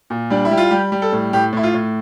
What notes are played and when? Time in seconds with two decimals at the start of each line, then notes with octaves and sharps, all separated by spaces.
0.10 A#2
0.30 G3 D4
0.45 E4
0.51 G3
0.57 F4
0.71 G3 G4
0.92 G3
1.02 A4
1.12 A2
1.33 A2 G4
1.53 A2 E4
1.63 F4
1.74 A2